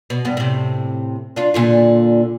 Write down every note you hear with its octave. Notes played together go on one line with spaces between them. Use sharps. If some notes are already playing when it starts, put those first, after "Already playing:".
B2
G2 B3
A2 C3
D4 F4
A#2 D3 F4